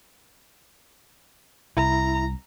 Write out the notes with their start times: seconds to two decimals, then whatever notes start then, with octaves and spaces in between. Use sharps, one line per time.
1.77 C2 E4 A#5